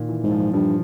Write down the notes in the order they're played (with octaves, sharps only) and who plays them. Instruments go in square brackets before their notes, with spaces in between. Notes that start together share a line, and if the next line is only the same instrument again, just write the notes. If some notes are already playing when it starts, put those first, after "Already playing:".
Already playing: [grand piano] A#2 D#3
E3
[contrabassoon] G#2
[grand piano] F3
[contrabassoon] G2 [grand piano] F3